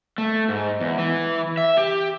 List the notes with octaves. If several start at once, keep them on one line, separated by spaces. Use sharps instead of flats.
A3
G#2
E2
E3
E5
G4